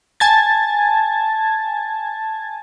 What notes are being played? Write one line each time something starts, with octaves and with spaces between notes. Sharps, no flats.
G#5 A5 G#6 A6